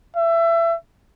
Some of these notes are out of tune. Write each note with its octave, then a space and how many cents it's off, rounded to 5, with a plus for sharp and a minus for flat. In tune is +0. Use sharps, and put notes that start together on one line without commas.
E5 +25